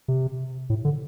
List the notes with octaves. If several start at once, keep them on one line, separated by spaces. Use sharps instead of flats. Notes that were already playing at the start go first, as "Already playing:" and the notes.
C3
A2
D3